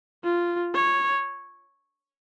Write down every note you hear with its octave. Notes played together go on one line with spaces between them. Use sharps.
F4
C#5